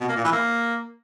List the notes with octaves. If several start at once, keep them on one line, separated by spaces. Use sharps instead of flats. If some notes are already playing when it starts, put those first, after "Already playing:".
B2
A#3
A#2
E3
A#3